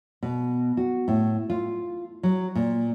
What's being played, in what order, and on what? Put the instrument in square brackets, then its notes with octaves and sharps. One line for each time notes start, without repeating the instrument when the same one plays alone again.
[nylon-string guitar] B2
F#4
A2
F4
F#3
A#2